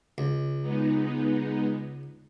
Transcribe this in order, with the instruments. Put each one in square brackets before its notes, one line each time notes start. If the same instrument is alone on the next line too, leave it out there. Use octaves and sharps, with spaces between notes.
[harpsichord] C#2
[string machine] G#3 B3 D#4